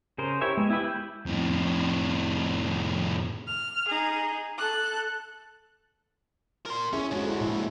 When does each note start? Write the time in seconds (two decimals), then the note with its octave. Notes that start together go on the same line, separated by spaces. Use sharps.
0.18 C#3 G#4 A#4 C5
0.41 E4 G4 C#5 E5
0.57 G#3 B3
0.70 E4 G4 B4 E5
0.84 B5 G6
1.26 F2 A2
3.47 F6
3.88 D#4 G#4
4.57 A4 F#6
6.66 A#4 C6
6.93 C#4 E4 G#4 E5
7.11 D3 G#3 F#4 C#5
7.26 E4 A4
7.41 A#2 E4